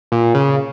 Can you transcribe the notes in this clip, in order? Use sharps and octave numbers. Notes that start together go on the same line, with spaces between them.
A#2
C#3